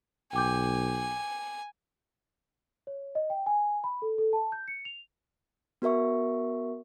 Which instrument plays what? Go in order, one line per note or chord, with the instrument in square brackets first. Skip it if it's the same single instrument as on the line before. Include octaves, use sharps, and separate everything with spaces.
[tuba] B1 [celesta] G5 D6 G6 [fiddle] G#5
[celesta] C#5
D#5
G5
G#5
B5
A4
A4
A5
G6
C#7
F7
[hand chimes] B3 F#4 A#4 E5 C#6